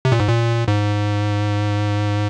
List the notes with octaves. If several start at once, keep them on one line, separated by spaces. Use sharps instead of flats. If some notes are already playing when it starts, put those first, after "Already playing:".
C3
A#2
G#2
A#2
G#2